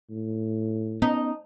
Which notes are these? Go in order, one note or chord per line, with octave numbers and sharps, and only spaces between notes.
A2
B3 C#4 D#4